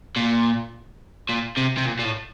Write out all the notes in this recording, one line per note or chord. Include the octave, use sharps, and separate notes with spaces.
A#2
A#2
C3
C3
A#2
A#2
A2